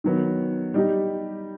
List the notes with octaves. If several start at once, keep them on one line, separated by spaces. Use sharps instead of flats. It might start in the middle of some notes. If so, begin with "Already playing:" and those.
D#3 F#3 B3
G3 D#4 G4